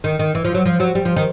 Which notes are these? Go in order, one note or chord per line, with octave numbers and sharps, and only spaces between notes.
D#3
D#3
E3
F3
F#3
F3
F#3
G3
F3
D#3